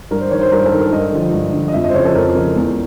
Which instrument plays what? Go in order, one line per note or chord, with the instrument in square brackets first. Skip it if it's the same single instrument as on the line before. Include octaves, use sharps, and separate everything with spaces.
[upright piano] G2 A#4
C5
D#3 C#5
C5
G2 A#4
A4
D#3
A#4
G2 D#5
D3 F3
G2
D3 F3
D#5
F2 E5
D#5
C5
C#3 F3 C#5
A4
F2 A#4
C#3 F3
E2